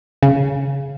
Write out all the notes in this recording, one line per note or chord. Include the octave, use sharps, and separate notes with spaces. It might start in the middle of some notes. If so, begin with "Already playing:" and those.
C#3